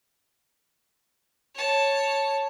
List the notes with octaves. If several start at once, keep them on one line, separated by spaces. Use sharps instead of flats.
C#5 A5